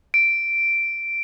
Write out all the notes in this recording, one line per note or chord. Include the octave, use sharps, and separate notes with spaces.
D7